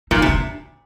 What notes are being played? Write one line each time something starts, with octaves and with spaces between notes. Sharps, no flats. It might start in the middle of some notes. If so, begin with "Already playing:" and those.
A#2 D#4
C3
D4